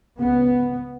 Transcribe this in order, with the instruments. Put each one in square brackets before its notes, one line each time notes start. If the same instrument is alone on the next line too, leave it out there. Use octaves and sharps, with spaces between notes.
[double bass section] C#2 C#3 B3